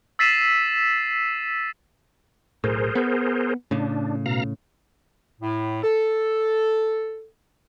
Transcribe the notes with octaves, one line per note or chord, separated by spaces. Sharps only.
E6 A6 B6 C7 D#7 E7
B1 A2 G#4 A#4 C5
B3
A2 C#3 D4
B2 F5 A#5
A2
A4